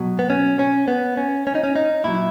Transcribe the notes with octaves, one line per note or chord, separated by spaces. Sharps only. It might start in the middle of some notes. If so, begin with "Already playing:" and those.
Already playing: B2 F#3
B3
C#4
C#4
B3
C#4
C#4
D#4
C#4
D#4
A#2 F#3 E4